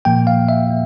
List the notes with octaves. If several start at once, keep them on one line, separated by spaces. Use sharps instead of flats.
A#2 F3 A#3 G5
F5
E5
A#3